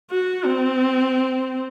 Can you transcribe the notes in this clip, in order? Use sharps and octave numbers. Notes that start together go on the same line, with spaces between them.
F#4
C4